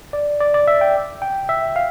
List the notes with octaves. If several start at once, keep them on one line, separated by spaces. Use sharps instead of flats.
D5
D5
D5
E5
G5
G5
E5
F5